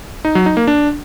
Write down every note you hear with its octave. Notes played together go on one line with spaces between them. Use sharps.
D#4
F#3
D#4
A#3
D4